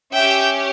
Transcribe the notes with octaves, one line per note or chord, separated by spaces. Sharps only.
C#4 G4 E5 G5